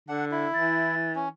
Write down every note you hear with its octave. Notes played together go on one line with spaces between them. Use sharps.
D3 D4 F#5
E4
E3 A6
C#4